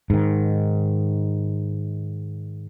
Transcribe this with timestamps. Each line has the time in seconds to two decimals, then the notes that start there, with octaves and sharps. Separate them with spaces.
0.10 G#2 D#3